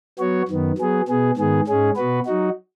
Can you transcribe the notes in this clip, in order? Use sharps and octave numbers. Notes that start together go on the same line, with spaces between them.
F#3 B3 F#4 C#5
F#2 D#3 B3
F#3 B3 G#4
B2 B3 G#4
G#2 D#3 B3 G#4
G#2 G#3 C#4 G#4
B2 B3 F#4 B4
F#3 D#4 F#4